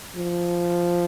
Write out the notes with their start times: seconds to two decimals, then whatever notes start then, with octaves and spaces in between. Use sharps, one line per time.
0.16 F3